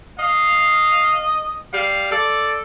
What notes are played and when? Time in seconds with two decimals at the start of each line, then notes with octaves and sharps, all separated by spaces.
0.19 D#5 F5
1.73 G3 F5
2.11 A4 D5